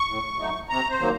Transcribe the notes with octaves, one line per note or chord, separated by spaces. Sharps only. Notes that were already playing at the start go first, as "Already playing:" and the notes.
Already playing: C#6
A2
F#3 A3 D#4
C3 A#5
C5
D#3 F#3 A#3